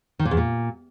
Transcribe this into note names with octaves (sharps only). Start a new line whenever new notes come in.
D#3
A#2
E2
A#2